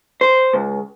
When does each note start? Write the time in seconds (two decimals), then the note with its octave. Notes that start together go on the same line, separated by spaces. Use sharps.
0.21 C5
0.53 C#2